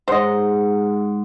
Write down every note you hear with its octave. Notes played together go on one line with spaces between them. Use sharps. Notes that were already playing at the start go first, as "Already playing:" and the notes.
G#2 C5 D#5 F#5